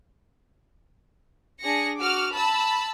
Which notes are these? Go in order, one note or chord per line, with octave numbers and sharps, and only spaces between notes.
D4 G#4 A#6 C#7
F#4 D6 F6
A5 B5 E6